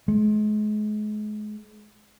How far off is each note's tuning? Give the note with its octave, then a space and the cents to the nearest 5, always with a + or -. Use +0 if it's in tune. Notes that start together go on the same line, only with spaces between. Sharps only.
G#3 +35